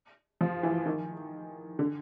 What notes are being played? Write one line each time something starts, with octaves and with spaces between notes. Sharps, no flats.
F3
E3
D#3
D3